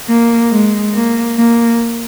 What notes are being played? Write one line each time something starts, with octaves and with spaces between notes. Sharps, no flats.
A#3
G#3
A#3
A#3